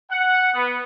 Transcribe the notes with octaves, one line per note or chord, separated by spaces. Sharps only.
F#5
B3